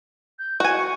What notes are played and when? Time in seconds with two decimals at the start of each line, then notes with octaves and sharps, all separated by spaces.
0.39 G6
0.60 F#4 G#5 C#6